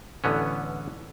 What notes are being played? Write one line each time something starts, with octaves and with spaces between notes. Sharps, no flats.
A1 D3 B3 C#4